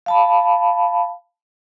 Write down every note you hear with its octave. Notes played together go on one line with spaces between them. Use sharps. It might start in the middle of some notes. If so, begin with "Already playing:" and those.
F5 A5 B5